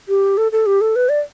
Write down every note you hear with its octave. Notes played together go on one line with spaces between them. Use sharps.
G4
A4
A4
G4
A4
B4
D5